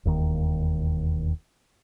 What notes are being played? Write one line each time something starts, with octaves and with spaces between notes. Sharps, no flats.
E1 D#2 D#3